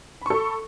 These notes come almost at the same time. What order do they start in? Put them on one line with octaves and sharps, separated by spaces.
B5 C#6 A4